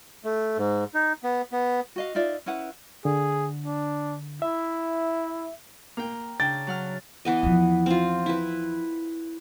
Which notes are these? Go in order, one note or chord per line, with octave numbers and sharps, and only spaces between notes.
A3
G#2
D#4
B3
B3
F#4 D#5 F5
D#4 F4 D5 E5
C#4 E4 B4 F#5
D3 G#4
D4
E4 E5
A#3 G5 A#5
C#3 D4 G5 A6
F#3 F#5 F6
E3 B3 D#5
E2 F3
C4 F4
E4 B4